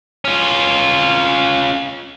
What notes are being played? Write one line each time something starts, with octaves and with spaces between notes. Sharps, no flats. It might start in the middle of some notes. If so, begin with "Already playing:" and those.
C#4 F4